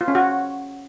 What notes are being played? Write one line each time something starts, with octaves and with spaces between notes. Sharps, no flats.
F4
C#4
F#4